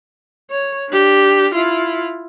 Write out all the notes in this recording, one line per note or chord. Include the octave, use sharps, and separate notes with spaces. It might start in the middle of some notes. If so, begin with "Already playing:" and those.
C#5
D4 G4
E4 F4